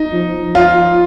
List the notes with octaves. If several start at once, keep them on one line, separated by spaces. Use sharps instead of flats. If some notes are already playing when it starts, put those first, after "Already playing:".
Already playing: D#4
F3
F3 F4